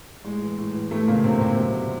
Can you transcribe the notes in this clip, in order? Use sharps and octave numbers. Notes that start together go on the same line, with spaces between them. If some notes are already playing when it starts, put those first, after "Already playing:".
A2 G#3
E3
A2
E3
A2 E3 A3
A#2 C#3 A#3
E2 C3 C4
E2 C3 C4
F#2
D3